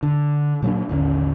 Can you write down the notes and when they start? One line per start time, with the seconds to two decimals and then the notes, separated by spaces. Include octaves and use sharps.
0.03 D3
0.62 A#2 F#3 A#3 D4
0.89 A1 D#2 D3 C#4